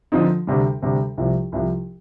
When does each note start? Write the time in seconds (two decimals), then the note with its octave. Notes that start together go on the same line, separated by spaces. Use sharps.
0.12 D3 F3 C4 D#4
0.47 D2 C3 G3
0.82 D2 C3 G3
1.17 C2 C3 F3
1.52 C2 C3 F3